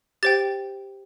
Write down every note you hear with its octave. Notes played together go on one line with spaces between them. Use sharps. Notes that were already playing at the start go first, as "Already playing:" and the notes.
G4 C5 G5 A6